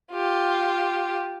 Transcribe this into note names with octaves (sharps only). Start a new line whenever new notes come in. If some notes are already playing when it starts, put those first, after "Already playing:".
F4 G4